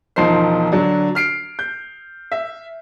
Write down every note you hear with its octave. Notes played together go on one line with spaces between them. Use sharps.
E1 F3 D#4 C5 C7
D3 F#3 D4
F6 C7 D7
G6
E5